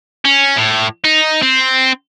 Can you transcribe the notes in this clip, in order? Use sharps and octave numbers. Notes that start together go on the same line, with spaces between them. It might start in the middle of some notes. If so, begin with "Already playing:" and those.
C#4
A2
D#4
C4